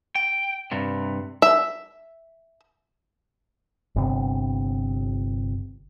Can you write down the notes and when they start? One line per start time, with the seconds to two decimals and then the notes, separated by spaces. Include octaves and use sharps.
0.15 G5
0.72 G2 C3
1.42 E5
3.96 G1 C3